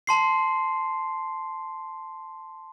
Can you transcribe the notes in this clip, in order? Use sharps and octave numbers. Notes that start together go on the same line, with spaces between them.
A5 C6 C7